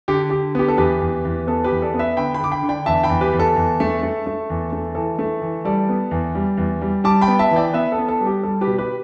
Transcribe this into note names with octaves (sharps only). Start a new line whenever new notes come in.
D3 G4
D3 G4
B3 G4
A4
E2 G4 B4
E2
E2
B3 A4
G4 B4
E2
A4 D5
B3
B4 E5
D3 G5 B5
G5 B5
D3 D6
G5 B5
D3
D5 G5
E2 E5 A5
G5 B5
E2
G4 B4
E2
A4
E2
A3
A3
A3
E2
A3
E3 A4
A3
E3
G3 A4 D5
B3
E2
G3
E2
G3
G3 A5 D6
G5 B5
B3
E5 A5
E3
D5 G5
B3 B4 E5
A4
B3
A4
G3
G4
G3 A4
G4 B4
B2
G4 B4